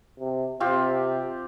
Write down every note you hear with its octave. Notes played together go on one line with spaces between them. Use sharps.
C3
C3 C4 F4 G4